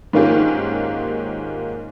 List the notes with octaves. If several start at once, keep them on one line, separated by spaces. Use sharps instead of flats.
G#2 D#3 A#3 C#4 F4 G4